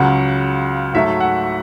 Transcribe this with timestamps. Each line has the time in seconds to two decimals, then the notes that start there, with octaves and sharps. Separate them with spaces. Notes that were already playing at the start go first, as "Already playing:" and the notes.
Already playing: C#2 C#3 F#3 F#5
0.94 G#2 F#3 A3 E5
1.20 F#5